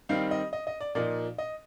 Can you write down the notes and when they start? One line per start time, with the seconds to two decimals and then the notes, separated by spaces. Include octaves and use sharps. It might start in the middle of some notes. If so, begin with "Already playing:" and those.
0.09 D#3 G3 C4 D#4 F5
0.31 D#5
0.53 D#5
0.67 D#5
0.81 D5
0.95 A#2 F3 A#3 D#4 D5
1.38 D#5